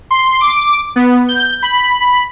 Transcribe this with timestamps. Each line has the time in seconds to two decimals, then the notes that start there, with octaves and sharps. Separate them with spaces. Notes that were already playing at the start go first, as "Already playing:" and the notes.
0.11 C6
0.41 D6
0.96 B3
1.29 G6
1.63 B5
2.01 B5